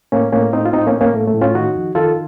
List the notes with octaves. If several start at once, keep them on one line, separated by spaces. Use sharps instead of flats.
A2 A#3 C#4
A2 A#3 C#4
A2 C4 D#4
F4
A2 C4 D#4
A#3 C#4
A2
A#3 C#4
A2 A3
A3
A2
C#4 F4
D#3 D#4 F#4
F2
D#3 F4 A4